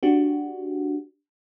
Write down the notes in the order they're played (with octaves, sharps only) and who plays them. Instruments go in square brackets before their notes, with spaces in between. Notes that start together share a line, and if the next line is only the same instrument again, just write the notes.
[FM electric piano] D4 F#4 G4